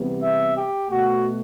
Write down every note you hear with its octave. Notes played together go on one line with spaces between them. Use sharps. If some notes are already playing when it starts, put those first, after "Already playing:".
Already playing: E2 C3 G3 B3
E5
G4
B2 A3 F#4